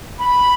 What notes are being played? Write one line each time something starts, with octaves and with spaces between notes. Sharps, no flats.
B5